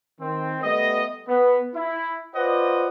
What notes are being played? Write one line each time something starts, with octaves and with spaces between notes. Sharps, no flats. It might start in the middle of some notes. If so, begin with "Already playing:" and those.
D#3 C4
G3 A3 B3 D#5
B3
E4
F4 B4 C5 D5 D#5 F#5